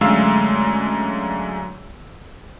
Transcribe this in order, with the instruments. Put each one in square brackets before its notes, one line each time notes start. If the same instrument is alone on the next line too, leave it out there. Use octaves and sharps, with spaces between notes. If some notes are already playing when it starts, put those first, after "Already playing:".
[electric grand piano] F#2 D3 G#3 A3 F5 E6